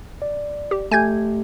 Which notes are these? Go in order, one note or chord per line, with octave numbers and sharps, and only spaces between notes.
D5
G4
A3 G4 G#5 G6 G#6